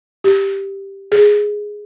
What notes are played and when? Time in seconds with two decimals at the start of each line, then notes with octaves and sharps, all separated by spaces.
0.24 G4
1.12 G#4